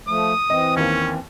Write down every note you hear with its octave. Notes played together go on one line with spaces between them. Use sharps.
F3 A3 D#6
E3 C4 D#5
D#2 A#3 C#4